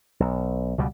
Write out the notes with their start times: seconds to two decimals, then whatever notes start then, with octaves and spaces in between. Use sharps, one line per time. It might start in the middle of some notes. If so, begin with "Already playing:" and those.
0.20 B1
0.78 C#2 B2 G3